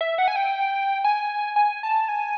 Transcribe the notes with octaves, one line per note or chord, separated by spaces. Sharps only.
E5
F#5
G#5
G5
G#5
G#5
A5
G#5